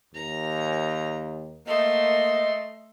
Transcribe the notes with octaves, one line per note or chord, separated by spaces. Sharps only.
D#2 A#5
A3 A#3 D#5 C6